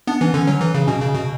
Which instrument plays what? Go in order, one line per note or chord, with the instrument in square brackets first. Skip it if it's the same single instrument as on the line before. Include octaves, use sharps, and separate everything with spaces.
[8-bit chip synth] B3 [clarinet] D4
[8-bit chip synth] E3 [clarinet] C#4
[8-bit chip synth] D3 [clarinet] C#4
[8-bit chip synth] F#3
E3
C#3
[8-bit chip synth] B2 [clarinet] C#4
[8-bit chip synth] C#3
[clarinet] C#4
[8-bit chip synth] B2